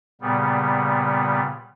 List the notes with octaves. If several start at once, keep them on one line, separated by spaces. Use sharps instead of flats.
A#2 C#3 G3 B3